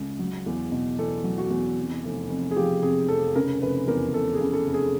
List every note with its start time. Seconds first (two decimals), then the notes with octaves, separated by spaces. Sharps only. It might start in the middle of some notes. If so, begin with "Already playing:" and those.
Already playing: C#2
0.19 F#3
0.46 E2
0.72 B2
0.99 E2 A4
1.24 F#3
1.38 F#4
1.50 E2
1.78 C3
2.04 F1
2.29 F2
2.51 G#4
2.57 F3 G4
2.82 C3 G#4
3.08 F1 A4
3.36 C#3 A#4
3.62 F1 B4
3.87 E2 A#4
4.14 F1 A4
4.35 G#4
4.41 C#3
4.53 A4
4.67 F1
4.74 G#4